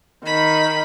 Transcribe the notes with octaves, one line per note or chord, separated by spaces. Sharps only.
D#3 B5